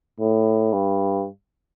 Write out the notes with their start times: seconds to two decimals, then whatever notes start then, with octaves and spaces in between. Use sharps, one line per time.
0.20 A2
0.73 G2